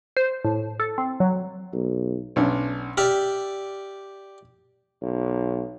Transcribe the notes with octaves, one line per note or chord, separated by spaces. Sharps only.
C5
A2
A4
C4
F#3
B1
B1 C#4 D4
G4 D5 E5 F6
B1